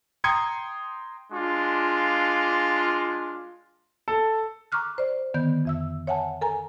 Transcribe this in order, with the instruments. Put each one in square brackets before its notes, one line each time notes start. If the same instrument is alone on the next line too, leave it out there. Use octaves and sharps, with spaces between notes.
[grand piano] G5 A#5 C6 D#6 G#6 C#7
[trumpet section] G#3 D4 F4
[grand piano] A4
[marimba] A#5 C#6 D6 F6 F#6
C5 D5
D3 D#3 B3 G6
F2 E5 E6
C#5 E5 F#5 G#5 A5
A4 A#4 G#5 A#5